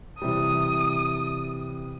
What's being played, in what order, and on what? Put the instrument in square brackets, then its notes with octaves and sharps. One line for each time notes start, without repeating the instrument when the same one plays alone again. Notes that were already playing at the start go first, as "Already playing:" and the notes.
[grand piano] C3 E3 G3 [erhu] D#6